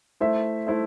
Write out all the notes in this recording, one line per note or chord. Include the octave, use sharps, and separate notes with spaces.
A3 E4 C5 E5
A3 E4 C5 E5